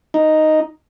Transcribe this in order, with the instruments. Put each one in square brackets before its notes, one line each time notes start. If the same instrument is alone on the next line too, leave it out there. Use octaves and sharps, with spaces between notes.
[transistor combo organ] D#4